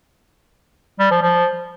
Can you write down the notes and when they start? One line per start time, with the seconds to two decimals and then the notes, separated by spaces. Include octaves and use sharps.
1.00 G3
1.11 F3
1.22 F3